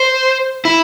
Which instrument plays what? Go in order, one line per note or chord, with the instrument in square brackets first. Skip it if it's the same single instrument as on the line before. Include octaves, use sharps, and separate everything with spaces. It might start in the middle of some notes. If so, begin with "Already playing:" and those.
Already playing: [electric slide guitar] C5
E4